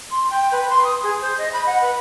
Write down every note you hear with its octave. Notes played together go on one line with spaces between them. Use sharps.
C6
G5
B4
C6
D#6
G#4
C5
D#5
B5
F#5
B4